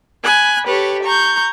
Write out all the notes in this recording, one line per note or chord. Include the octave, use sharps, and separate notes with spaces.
G#5 B5 F#6
G4 A4 B4 C#5
A#5 C#6 G6